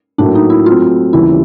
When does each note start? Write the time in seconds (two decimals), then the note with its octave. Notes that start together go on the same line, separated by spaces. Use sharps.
0.18 A2 F#3 A#3 D4
0.35 D#4
0.50 E4
0.66 F#3 A3 C4 F4
1.13 D#2 C#3 E3 G3 E4